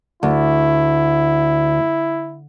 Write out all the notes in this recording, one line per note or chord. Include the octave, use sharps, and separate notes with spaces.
D2 E4